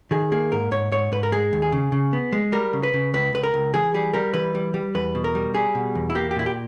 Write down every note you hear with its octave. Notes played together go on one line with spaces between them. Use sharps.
D#3 G#4
A#3 G#4
G#2 A#4
G#2 C#5
G#2 C#5
G#2 B4
A#4
G#3 G#4
D#2
G#4
C#3
C#3
B3
G#3
G3 A#4
C#3
B4
C#3
C#2 B4
C#2 B4
A#4
C#2
E3 G#4
G3 G#4
G3 A#4
E3 B4
G3
G3
E2 B4
B2
A#4
G3
G3 G#4
B2
E2
E4
A#3 G4
G4
A#2 E4
G4